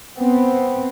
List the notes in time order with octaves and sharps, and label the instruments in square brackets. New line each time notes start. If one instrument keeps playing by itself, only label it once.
[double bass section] B3 C4